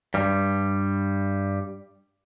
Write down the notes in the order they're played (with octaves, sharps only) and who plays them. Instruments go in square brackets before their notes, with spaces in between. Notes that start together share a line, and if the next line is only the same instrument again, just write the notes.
[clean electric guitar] G2 G3